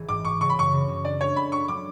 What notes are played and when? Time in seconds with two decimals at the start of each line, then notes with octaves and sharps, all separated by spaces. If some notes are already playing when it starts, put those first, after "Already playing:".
Already playing: G#1 E3
0.09 G#2 D6
0.25 G#2 C#6
0.40 C#3 C#6
0.50 B5
0.56 F#2 C#6
0.73 C#3
0.88 F#2
1.04 D4 D5
1.20 G#3 C#5
1.36 A4 B5
1.52 D4 C#6
1.68 F#3 D6